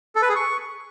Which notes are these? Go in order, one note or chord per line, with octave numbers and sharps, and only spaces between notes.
A4
B4
G#4
C#6